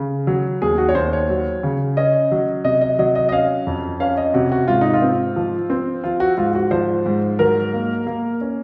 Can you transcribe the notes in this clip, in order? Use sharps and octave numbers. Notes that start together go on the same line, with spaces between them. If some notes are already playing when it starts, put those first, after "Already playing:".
Already playing: C#3
F#3
D#2 G#4
F#4
C#5
D#2 C5
C#5
F#3
C#3
C#4 D#5
F#3
C3 D#5
D#5
F#3 D#5
D#5
D#5
C#4 F5
F2
C#4 F5
D#5
C3 F#4
F#4
G#2 F4
D#4
F4
C4
F3
C4
F3 F4
F#4
G#2 F4
F#4
F3 C5
G#2
F#3 A#4
A#3
A#3
C#4